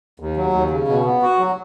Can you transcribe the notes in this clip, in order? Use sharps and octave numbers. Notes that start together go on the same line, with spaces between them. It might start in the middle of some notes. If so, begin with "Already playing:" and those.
D#2
F#3
D#2
C#3
B2
B3
F#4
F#3